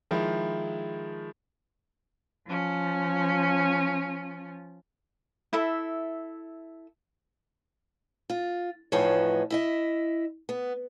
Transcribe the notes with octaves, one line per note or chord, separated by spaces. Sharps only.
D#3 F3 G#3 E4
F3 C#4
E4 A4 E5
F4
E2 A2 F3 D#4 B4 C#5
E4 D#5 E5
B3